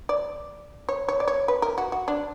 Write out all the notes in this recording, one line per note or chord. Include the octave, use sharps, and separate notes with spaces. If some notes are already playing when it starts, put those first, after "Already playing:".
D5
C#5
C#5
D5
C#5
B4
A#4
F#4
F#4
D4